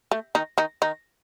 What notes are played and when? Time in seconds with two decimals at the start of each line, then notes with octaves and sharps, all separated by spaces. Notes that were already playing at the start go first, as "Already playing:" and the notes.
0.11 A3
0.35 D#3 D#4
0.58 D#3 D#4
0.82 D#3 D#4